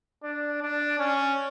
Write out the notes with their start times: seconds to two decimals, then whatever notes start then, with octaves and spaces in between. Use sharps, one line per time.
0.23 D4
0.62 D4
0.99 C#4